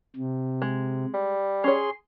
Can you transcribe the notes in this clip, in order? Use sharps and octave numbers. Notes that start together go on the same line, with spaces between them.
C3
G#3
G3
C#4 G#4 C#5 C6